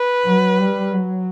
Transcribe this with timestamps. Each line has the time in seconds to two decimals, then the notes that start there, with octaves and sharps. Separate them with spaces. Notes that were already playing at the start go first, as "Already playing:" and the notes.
Already playing: B4
0.25 F#3
0.57 G3
0.92 F#3